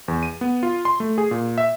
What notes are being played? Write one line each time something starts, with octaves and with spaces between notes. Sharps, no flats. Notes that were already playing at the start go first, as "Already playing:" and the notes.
E2
D#7
B3
F4
C6
A3
G#4
A#2
E5